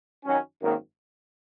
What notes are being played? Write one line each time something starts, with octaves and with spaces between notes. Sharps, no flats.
F#2 D#3 F#3 C#4
G#1 F#2 D#3 A#3